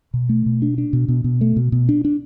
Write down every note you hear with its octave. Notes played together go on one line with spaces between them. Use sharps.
B2
A3
B2
D4
D4
B2
B2
B2
A3
B2
B2
D4
D4